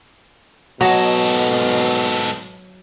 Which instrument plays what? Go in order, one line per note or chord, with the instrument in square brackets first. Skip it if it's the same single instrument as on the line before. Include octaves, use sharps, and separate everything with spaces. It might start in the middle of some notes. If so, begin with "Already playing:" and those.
[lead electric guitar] G#2 A4 [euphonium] B2 [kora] F#3 F#4 D#5